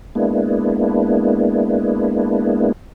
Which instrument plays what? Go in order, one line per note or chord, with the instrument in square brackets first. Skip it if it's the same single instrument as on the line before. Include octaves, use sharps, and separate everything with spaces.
[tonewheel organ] G#3 A#3 B3 D4 E4